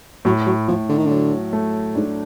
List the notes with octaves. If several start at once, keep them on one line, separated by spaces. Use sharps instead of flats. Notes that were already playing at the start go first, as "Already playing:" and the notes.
A2 F#3
F#3
A2 F3
D3
D#3
D3 F#3
A3
G#2 D4